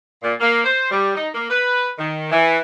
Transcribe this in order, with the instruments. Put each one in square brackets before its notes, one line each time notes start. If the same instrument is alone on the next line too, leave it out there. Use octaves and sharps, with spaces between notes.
[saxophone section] A#2
A#3
C5
G3
D#4
A#3
B4
D#3
E3